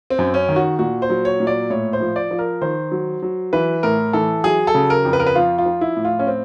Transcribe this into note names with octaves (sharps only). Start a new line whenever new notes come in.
C4
F#2
C#4
D#3
F#4
A#2 F#4
C5
F#3
C#5
A#2
D5
A2 C#5
C5
F3
D5
F3
A#4
D#3 C5
F#3
F#3
E3 B4
A2 A#4
E3 A4
F#3 G#4
A4
C#3
A#4
F2
B4
A#4
B4
F3 F4
F4
F3
E4
A2
F4
C#4
C4